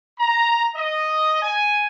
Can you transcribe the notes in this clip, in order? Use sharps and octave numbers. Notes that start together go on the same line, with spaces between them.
A#5
D#5
G#5